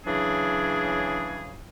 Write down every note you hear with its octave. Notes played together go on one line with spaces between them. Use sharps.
C#3 E3 F#3 D4 G#4